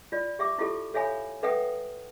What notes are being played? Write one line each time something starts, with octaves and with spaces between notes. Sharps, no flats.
F4 D5
G4 E5 D6
E4 F4 G4 A4
A4 C#5 E5 F5 G#5 B5
A4 B4 E5 F#5 G5 D#6